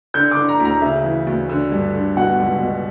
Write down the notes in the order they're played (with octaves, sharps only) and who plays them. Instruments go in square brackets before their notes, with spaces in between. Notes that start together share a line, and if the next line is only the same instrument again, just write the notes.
[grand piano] D3 G6
D6
D3
A#5
D2
A#5
C#3 E5
E3
D2
D3
G2
D3
B2 F#5
C#2
B2